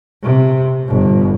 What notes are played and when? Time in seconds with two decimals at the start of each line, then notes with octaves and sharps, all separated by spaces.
0.23 C3
0.85 G1 B2